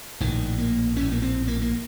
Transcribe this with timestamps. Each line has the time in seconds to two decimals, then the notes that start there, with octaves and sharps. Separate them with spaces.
0.20 A#1 A2 D#3
0.58 A#3
0.96 A#1 A2 C#4
1.12 A#3
1.22 C4
1.47 A#3
1.62 A#3